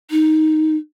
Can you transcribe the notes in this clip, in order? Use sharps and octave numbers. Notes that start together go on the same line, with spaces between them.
D#4